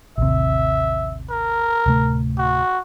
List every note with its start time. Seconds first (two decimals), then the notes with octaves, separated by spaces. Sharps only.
0.18 A1 D#2 C3 E5
1.30 A#4
1.86 D1 C3 A3
2.38 F#4